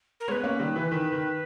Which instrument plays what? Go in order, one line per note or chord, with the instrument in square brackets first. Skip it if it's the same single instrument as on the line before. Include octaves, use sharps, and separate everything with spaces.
[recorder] A#4
[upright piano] G#3 B3 [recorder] B4 C#5
[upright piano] A#3 C#4
D#3 G3
E3
D#3
D#3